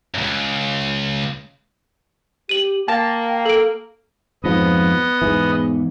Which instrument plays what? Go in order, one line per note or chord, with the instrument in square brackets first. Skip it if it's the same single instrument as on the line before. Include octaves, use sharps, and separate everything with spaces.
[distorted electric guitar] C#2 F#2
[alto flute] G4 [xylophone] D#7 F#7
[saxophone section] A#3 [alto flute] G5 [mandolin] A5
[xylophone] A4 D7
[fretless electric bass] F2 G#2 F3 [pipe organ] B3 D#5
[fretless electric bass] E2 G#2 E3